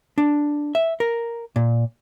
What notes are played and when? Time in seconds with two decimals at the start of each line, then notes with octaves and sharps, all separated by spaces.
0.18 D4
0.75 E5
1.00 A#4
1.56 A#2